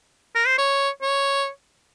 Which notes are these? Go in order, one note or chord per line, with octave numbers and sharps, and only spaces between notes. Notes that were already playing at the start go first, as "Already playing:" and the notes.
A#4
C5
C#5
C#5